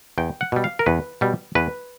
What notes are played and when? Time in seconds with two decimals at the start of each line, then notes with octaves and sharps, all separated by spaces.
0.18 E2 G5
0.41 F#5
0.52 B2 G3
0.64 F5
0.79 A#4
0.86 E2 B4
1.21 B2 G3
1.55 E2 B4